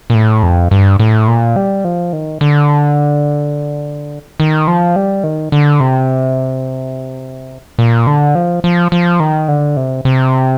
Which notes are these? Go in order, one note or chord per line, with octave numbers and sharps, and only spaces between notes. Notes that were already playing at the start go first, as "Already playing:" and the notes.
A#2
A2
F2
G2
A2
A#2
G3
F3
D#3
D3
D#3
F3
G3
D#3
D3
C3
A#2
D3
F3
F3
F3
D#3
D3
C3
C3